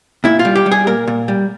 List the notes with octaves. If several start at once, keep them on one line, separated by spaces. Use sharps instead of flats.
A#2 E4
F4
G3
G4
G3
G#4
A#2 A#4
A#2
G3